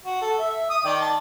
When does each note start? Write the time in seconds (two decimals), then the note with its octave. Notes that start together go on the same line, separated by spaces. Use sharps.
0.06 F#4
0.22 A4
0.39 E5
0.70 D#6
0.85 D#3 D5 G5
1.01 A5